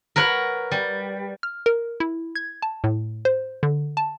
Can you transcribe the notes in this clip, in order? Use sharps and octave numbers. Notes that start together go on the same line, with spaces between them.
A#4 B4 C#5 F#5
G3
F6
A#4
E4
G#6
A5
A2
C5
D3
A5